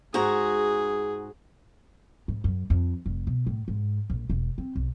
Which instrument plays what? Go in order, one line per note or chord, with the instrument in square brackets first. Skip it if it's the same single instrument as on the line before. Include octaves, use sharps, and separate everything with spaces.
[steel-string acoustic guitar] G#2 F#4 A#5 [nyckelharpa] G#4
[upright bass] G#2
F#2
F2
F1
B2
A2
G#2
A#1
E1
C4
B1